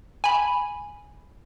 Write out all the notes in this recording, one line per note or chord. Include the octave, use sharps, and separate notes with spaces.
G#5 B5